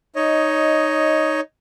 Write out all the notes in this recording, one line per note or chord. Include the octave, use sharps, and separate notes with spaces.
D#4 C#5 D#5